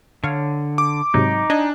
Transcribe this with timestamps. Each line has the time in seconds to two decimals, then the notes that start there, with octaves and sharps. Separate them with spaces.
0.24 D3 C#5 F5
0.78 D6
1.14 G#2 C3 F#3 D#4
1.50 D4 D#5 G#5